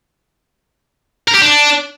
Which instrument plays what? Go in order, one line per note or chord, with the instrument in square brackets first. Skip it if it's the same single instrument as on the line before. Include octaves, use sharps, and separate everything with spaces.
[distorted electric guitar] A#4
G4
D4